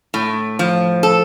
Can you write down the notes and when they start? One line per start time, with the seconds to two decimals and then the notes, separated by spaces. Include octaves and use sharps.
0.14 A2
0.59 F3
1.03 A4